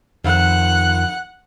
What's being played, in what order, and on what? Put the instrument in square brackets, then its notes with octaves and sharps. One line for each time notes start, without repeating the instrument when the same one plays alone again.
[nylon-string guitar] F2 D#3 [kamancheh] F#5 F#6